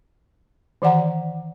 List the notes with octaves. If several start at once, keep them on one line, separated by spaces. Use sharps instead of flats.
D#3 E3 D5 F#5 A#5